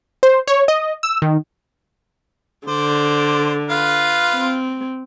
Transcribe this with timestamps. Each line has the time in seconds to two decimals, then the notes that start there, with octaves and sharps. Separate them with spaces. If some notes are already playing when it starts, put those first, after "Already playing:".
0.23 C5
0.48 C#5
0.68 D#5
1.03 E6
1.22 D#3
2.68 D3 C5 D5
3.70 F4 B4 F5
4.35 C4